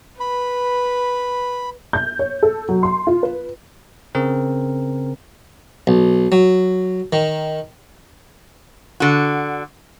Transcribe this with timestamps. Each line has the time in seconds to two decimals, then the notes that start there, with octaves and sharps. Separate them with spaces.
0.20 B4 B5
1.93 G6
2.19 C#5
2.43 A4
2.69 F#3
2.83 C6
3.07 F4
3.23 B4
4.15 C#3 C4 A#4
5.87 B1
6.32 F#3
7.13 D#3
9.00 D3 F#4